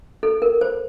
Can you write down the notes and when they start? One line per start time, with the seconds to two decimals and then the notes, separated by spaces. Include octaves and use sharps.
0.23 A4
0.42 A#4
0.61 C5